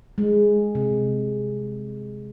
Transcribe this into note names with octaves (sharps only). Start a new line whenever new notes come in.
G#3
C3